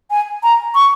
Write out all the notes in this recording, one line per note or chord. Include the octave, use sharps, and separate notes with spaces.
G#5
A#5
C#6